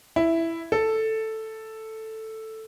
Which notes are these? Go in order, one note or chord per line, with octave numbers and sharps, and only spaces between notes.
E4
A4